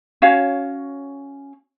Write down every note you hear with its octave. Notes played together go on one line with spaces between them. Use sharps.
C#4 F#4 C#5 F5